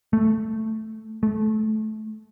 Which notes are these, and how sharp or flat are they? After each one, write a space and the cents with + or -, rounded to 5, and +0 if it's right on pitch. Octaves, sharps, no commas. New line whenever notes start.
A3 +5
A3 -20